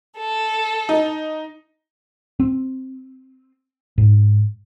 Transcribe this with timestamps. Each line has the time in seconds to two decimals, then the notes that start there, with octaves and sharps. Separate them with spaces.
0.18 A4
0.89 D#4
2.40 C4
3.98 G#2